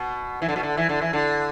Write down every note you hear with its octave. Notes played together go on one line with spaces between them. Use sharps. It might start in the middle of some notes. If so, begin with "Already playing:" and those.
Already playing: B2
E3
D3
B2
D3
E3
D3
E3
D3